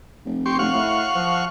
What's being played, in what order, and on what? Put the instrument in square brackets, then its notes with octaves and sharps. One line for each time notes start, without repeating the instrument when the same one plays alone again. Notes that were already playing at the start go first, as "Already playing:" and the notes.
[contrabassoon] F1
[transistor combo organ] G4 C6 C#6
[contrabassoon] F1 [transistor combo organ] F5 F#5 C#6
[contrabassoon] A2
F3